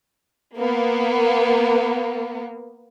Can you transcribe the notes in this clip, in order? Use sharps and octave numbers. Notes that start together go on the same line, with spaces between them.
A#3 B3